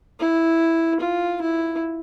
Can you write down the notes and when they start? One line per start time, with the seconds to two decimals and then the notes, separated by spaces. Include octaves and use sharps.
0.20 E4
1.00 F4
1.42 E4